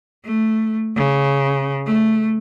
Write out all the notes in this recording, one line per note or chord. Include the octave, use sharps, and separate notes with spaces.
A3
C#3
A3